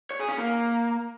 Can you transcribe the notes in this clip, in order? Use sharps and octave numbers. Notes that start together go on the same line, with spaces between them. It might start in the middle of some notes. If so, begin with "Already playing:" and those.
C#5
G#4
C#4
A#3